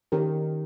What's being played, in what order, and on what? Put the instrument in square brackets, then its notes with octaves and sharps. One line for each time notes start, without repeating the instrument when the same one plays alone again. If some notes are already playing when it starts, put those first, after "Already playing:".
[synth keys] D#3 [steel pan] C#4 G4 A#4